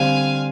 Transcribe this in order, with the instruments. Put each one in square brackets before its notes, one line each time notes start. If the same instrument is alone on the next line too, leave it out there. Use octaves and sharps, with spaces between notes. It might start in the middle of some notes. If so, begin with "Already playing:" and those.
Already playing: [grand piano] D3 G3 C4 [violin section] F5 G#5